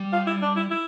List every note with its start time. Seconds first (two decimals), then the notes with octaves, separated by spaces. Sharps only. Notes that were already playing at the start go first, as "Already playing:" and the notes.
Already playing: G3
0.13 F4
0.27 E4
0.42 D4
0.56 E4
0.71 E4